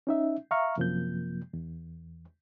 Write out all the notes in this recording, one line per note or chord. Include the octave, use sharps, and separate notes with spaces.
C#4 D#4 E5
E5 F5 A#5 C#6 F6
F#2 C3 F3 A#3 G6
E2